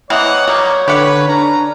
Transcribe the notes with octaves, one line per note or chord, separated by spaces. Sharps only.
E3 A#3 C4 C#5 D#5 F#5
F#3 G3 A#3
D3 G4 B4 F#5
C#4 D4 A#5